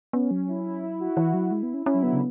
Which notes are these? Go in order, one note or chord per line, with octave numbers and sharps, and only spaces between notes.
B3 C#4
F#3
E4
E4
F#4
E3 E4
F#3
G#3
B3
C#4
C#4 E4
F#3
D3 B3
C#3